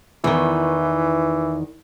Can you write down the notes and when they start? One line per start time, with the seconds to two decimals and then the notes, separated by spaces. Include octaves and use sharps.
0.24 E2 D#3 E3